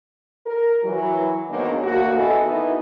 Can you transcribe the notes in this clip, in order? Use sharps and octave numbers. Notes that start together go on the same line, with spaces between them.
A#4
E3 F#3
G#2 D#3 F#3 A#3 B3 D4
D2 B2 A#3 F#4
E3 B3 A4 D#5
D#3 E3 B3 D#4 E4